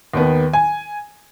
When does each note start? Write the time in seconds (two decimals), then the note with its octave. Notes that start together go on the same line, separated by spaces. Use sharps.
0.14 D#2 D#3 B3
0.53 G#5